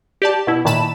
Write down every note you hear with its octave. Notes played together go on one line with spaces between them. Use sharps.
G4 D5 A5
B2 E4
A#2 D#3 E3 A5 B5 E7